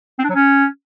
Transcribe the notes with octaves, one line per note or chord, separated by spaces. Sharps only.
C4
D4
F#3
C#4